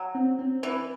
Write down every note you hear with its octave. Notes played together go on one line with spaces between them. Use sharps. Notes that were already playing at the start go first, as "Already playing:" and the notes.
Already playing: F#3
C4
C4
E3 B4